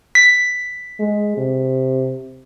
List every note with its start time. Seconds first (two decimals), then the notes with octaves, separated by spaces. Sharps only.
0.15 B6
1.00 G#3
1.37 C3